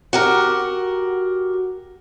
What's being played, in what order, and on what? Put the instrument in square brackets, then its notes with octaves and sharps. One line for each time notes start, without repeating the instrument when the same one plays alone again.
[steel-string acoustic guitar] F#4 G4 A#4